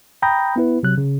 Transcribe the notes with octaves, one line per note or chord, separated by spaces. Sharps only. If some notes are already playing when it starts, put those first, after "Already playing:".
G5 A#5 B5 D#6 G6 A#6
B3 E4 B4
C3 F#3 F#6
C#3